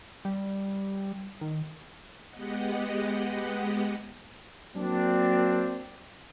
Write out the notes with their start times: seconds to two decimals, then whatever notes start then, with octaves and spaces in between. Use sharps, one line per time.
0.25 G3
1.41 D#3
2.30 G#3 B3 G4 D#5 F#5
4.76 F#3 A#3 C4 D4